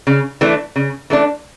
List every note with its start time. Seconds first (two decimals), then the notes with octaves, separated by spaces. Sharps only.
0.07 C#3
0.41 E3 A3 D4
0.76 C#3
1.10 E3 A3 D4